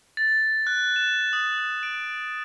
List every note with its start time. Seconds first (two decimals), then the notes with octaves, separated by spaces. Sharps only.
0.17 A6
0.67 F#6
0.96 E7
1.33 D#6
1.58 F#6
1.83 D7